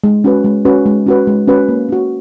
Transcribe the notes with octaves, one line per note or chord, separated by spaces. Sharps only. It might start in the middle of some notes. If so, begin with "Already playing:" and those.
G#3
C#4 F#4 B4
G#3
C#4 F#4 B4
G#3
C#4 F#4 B4
G#3
C#4 F#4 B4
A#3
C#4 F#4